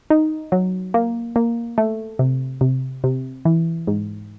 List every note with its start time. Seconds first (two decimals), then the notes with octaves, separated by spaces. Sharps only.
0.10 D#4
0.52 F#3
0.94 A#3
1.36 A#3
1.78 A3
2.19 C3
2.61 C3
3.04 C3
3.45 E3
3.87 G#2